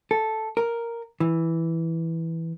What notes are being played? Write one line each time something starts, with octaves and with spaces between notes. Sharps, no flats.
A4
A#4
E3